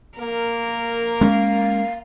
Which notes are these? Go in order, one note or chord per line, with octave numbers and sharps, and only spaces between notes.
A#3 A#4
G#3 C#4 F5